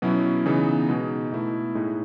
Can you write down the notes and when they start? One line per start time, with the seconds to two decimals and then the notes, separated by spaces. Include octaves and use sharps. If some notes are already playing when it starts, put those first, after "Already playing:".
0.02 B2 F#3 C#4 E4
0.46 C#3 E3 B3 D#4
0.89 B2 G#3 D#4
1.32 B2 A3 E4
1.75 A2 G#3 D#4